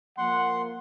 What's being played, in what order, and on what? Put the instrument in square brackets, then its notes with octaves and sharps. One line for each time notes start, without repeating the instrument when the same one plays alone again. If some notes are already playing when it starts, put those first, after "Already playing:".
[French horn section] F3 A#3 [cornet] F#5 [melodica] C6